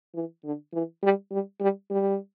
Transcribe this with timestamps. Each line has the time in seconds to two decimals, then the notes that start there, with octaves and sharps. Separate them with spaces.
0.14 E3
0.44 D3
0.73 E3
1.03 G3
1.32 G3
1.60 G3
1.90 G3